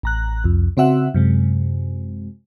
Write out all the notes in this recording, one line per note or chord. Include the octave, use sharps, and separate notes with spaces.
A1 A#5 F#6
C2 F2
C#3 C4 F#4 E5 F#5
F#2 C3 G#3